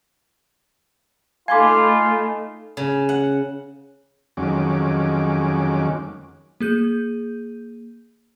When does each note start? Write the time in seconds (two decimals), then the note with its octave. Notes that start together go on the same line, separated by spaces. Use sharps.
1.48 A3 D#4 F4 F5 G#5 B5 C6 D6
2.77 C#3
3.09 F#5
4.37 F2 D#3 F#3 G#3 C#4 D6
6.61 A#3 G#4 G6 D#7